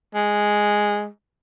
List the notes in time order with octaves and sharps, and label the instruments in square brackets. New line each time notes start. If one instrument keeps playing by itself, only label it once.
[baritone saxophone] G#3